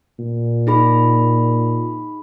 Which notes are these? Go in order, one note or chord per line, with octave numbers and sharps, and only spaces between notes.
A#2
D#4 G#4 B5